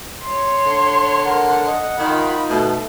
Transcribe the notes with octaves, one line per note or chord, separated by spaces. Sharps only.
C#5 C6
D3
A#4 F#5
D#5
D#3 D#4 F4 B5
B2 A3